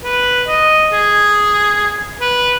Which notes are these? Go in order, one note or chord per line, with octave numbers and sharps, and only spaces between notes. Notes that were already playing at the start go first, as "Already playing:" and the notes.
B4
D#5
G#4
B4